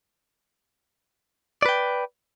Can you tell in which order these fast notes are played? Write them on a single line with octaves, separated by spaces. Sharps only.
D5 B4 G5